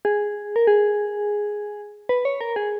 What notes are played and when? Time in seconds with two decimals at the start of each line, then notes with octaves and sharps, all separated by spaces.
0.05 G#4
0.56 A#4
0.67 G#4
2.09 B4
2.25 C#5
2.41 A#4
2.56 G#4